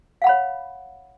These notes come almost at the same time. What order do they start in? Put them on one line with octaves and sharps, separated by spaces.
F5 F#5 B5 C#5